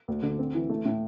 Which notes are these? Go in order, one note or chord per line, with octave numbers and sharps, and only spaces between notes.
D2
D3
C4
E3
A3
A2